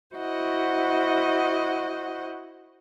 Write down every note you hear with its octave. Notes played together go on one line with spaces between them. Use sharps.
E4 F#4 C5 D#5 F#5